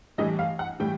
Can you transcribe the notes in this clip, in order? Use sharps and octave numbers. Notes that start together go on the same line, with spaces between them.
A2 E3 G3 D#5
F5
F#5
A2 E3 G3 G5